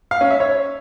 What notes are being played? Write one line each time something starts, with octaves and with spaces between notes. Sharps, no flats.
F5
C#4
E5
C#5